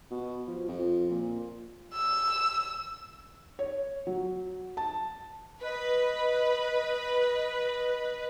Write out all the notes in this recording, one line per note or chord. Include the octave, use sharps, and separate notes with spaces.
B2
F3
F2
A#2
E6
C#5
F#3
A5
B4 D#5